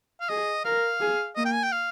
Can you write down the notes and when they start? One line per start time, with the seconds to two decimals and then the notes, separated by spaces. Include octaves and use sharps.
0.21 F5
0.29 G#4 D#5
0.65 A#4 F5
1.00 G#4
1.36 A#3 D#5
1.45 G5
1.54 G#5
1.63 G5
1.72 F5